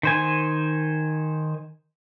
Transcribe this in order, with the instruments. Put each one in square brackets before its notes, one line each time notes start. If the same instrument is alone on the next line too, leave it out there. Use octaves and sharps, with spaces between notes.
[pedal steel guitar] D#3 C5 G#5